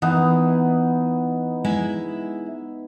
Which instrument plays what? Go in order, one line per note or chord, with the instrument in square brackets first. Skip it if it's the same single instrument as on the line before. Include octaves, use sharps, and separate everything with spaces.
[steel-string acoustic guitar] E3 [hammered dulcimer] B3 D#4 F#5
[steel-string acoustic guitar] G#3 E4 E5